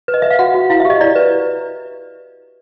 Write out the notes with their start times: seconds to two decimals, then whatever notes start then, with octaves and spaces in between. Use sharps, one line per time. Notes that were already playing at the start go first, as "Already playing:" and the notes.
0.08 B4
0.14 D#5
0.22 B4 E5
0.30 F5
0.39 F#4 F#5
0.54 F#4
0.70 E4 F5
0.80 E5
0.85 G4 D#5
1.00 E4 D5
1.16 B4